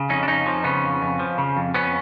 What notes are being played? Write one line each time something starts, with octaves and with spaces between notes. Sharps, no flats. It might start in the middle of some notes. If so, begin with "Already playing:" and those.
Already playing: C#3
F2 C#4 D#4
D4
F2 C#4 D#4
F3
C#3 B3 C#4
F2
F2
F3
C#3
F2
F2 B3 C#4